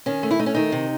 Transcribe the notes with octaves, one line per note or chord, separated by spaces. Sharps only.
D#3 C#4
A3
E4
A3 D#4
C#4
D#3 D#4
C3